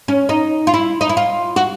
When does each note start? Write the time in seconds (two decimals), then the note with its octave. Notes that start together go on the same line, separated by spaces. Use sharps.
0.08 C#4
0.29 D#4
0.67 F4
0.74 E4
1.01 D#4
1.09 E4
1.17 F4
1.56 F#4